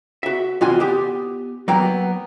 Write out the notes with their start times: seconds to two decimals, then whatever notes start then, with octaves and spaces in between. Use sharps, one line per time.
0.23 F#4 E5
0.61 E2 C3 F4 F#4 G#5 C6
0.80 B3 G4
1.68 F#3 A#3 B3 G5 A#5